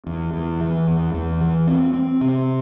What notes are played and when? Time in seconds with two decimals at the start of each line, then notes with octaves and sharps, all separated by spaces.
0.07 E2
0.33 E2
0.61 E3
0.87 E2
1.14 E2
1.41 E3
1.67 C4
1.93 C4
2.21 C3